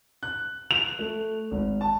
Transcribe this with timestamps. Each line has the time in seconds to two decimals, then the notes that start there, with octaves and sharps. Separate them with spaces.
0.23 F#6
0.71 F7
0.99 A3
1.51 G#1
1.81 A5